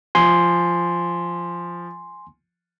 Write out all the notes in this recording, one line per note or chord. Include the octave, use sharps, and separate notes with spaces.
F3 G#5 C6